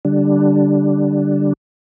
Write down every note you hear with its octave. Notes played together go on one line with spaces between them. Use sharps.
D3 G3 D4